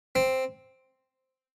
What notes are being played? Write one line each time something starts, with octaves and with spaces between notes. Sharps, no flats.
C4